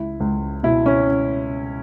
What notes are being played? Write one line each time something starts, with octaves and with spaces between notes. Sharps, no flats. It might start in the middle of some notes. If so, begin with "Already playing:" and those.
Already playing: C#2 E4
C#2
B2 E4
C#4